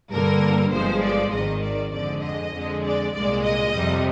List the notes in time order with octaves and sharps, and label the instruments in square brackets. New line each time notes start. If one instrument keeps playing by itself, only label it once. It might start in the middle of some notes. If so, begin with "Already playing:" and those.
[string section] G2 D3 G3 A#3 A#4
G1 G2 F3 G#3 C5
D5
G#1 G#2 D#3 D#5
D5
F2 D3 G#3 D5
D#5
F2 D3 G#3
D5
C2 A#2 G#3 D5
D#5
F2 C3 G3